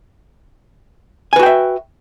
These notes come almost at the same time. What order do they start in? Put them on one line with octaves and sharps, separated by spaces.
G#5 B4 F#4 G5 E5